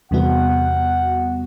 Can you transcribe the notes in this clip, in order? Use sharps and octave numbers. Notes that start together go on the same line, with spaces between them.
E2 C3 G3 B3 F#4 F#5